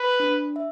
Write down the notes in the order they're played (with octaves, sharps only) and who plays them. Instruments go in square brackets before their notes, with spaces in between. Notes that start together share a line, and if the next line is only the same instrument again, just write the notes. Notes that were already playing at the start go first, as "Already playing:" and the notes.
Already playing: [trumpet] B4
[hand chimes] D4
E5